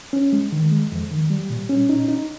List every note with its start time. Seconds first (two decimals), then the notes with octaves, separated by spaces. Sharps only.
0.13 C#4
0.33 G#3
0.52 D#3
0.72 G#3
0.92 F2
1.11 D#3
1.30 G3
1.50 A#2
1.69 C#4
1.89 D#4
2.08 D#4